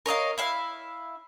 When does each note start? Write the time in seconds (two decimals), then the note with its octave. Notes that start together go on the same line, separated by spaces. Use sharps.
0.06 A#4 C#5 D#5 F5
0.38 E4 E5 F5